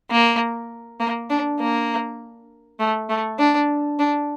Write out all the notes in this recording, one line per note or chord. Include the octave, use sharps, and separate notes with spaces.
A#3
A#3
D4
A#3
A3
A3
D4
D4